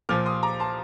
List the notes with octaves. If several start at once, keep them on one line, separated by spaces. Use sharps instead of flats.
A#2 F3 D6 F6
C6 D#6
A#5 D6
A5 C6